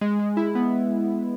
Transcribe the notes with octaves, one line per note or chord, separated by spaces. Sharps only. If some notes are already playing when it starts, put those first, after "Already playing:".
G#3
G#3
E4
B3